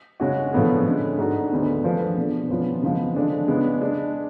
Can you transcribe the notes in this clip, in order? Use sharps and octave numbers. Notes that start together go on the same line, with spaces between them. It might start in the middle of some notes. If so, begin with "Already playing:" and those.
C#3 G#3 C#4 F#4
A2 F3 B3 D4 G#4
D3 G#3 C#4
G#2 G#3 D4 F#4 A4
D2 D3 G#3 B3 D4
F3 A3 D4 G#4 B4
B2 A3 D4
F#2 F3 G#3 B3 F4
C#3 F3 G#3 B3
D3 F3 G#3 D4
C#3 G#3 B3 D4
G#3 D4